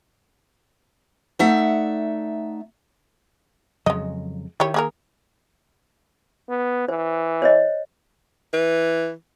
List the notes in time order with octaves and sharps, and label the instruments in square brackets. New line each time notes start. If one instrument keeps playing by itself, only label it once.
[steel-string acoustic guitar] A3 D#4 D5 E5 F#5
[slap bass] F2 C#3 F#3 [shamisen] G#3 D#5
[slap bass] D#3 [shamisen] E4 G4 C#5
[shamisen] A#3 G#4 A#4
[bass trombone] B3
[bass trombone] E3 [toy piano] C5
[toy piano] C5 C#5 D#5
[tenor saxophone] E3